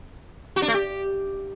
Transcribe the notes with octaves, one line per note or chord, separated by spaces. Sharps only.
F#4
D4
A3
G4